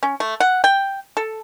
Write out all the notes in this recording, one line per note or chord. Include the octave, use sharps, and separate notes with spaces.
C#4
A3
F#5
G5
A4